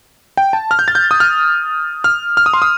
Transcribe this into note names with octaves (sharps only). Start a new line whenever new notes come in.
G5
A5
F6
G6
A6
G6
D#6
F6
F6
F6
D#6
C6
D#6